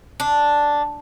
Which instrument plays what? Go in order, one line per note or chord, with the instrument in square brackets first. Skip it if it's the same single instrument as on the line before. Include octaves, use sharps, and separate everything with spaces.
[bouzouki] D4